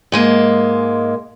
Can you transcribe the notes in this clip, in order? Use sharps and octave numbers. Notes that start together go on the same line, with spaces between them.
G#2 G#3 A#3